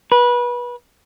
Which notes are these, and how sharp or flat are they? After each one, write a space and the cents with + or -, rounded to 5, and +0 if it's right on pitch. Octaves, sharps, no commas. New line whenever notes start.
B4 -25